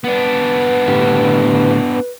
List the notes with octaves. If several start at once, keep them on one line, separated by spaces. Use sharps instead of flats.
B3 D4 B4
A2 D3 G4